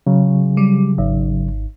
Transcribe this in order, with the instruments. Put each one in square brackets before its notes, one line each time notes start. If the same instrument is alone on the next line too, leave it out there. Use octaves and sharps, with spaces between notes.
[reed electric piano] C#3 F#3
[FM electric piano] G3
G#1